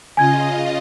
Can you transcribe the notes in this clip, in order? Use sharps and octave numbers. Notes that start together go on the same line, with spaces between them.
C#3 F4 D#5 G#5 G#6